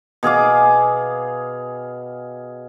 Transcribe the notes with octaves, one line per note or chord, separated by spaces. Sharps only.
B2 G#4 F5 D6